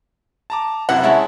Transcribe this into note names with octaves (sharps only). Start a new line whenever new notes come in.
A5 A#5 D6
F#2 C3 E4 F#5
G#3 C#4 E4 C#5 A5